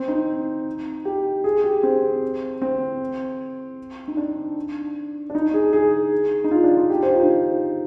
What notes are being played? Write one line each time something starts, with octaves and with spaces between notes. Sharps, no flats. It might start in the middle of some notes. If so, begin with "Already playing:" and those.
Already playing: C4
D#4
G4
G#4
G4
C4
C4
D#4
D4
D4
D#4
G#4
G#4
D#4
F4
D4
F4
G4
C5
F4
D#4